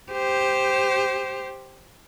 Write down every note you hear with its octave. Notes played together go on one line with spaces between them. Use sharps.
G4 C5